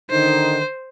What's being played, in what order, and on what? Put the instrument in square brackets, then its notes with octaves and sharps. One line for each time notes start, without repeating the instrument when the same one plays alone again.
[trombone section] D3 D#3 D#4 [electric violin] C5